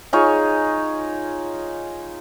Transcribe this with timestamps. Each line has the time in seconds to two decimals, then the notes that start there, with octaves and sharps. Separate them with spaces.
0.13 D#4 F4 G#4 C#5